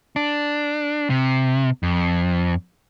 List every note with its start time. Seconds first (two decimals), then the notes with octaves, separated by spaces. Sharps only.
0.16 D4
1.10 C3
1.83 F2